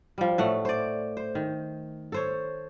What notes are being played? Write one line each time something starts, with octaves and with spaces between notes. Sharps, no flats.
F3 G3
A2 A3 F#5
C5 D5
C5
D#3
A4 C5 C#5